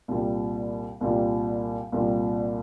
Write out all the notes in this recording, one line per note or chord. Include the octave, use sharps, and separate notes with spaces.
C2 A#2 G3
C2 A#2 G3
C2 A#2 G3